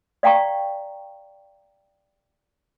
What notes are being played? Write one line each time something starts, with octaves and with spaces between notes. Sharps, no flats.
D5 F5 G5 A#5 C#6